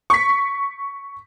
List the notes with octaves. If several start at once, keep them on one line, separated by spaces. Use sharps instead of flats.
C#6 B6